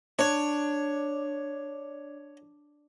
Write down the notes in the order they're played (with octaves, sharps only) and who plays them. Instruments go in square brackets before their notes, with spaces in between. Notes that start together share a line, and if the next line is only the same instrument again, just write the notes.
[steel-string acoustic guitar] D4 [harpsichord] C#5